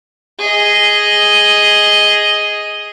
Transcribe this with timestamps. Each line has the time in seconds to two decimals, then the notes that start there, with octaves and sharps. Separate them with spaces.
0.39 G#4 D#5